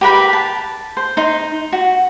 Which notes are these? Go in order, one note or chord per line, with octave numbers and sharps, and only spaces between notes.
G4 A#4 B4 B5
A5
C5
D#4 C6
F#4